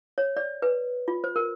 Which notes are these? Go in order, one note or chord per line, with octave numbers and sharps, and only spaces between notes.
C#5
D5
B4
F4
C5
A#4